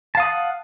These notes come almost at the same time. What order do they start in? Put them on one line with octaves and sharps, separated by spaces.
A5 F5 D#6 F#5